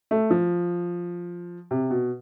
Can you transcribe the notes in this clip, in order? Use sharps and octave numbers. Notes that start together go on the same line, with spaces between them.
A3
F3
C3
B2